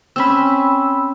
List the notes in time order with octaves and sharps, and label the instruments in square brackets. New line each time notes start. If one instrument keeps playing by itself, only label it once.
[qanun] C4 C#4 [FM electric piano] B5 E6